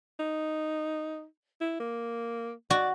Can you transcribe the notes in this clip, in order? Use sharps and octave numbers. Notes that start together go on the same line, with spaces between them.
D#4
E4
A#3
F#4 D5